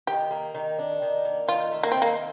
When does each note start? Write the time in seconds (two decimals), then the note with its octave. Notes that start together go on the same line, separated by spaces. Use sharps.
0.07 D#3 G4
0.31 A#3
0.55 D#3
0.79 D4
1.02 D#3
1.25 A#3
1.48 D#3 F4
1.72 A3
1.83 A#3
1.92 D#3 C4
2.02 A#3